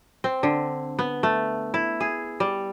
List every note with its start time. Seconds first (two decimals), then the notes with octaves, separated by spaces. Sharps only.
0.24 C4
0.43 D3
0.99 B3
1.23 A3
1.74 E4
2.00 G#4
2.40 G3